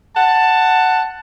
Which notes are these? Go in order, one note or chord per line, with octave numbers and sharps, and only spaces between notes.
F#5 A5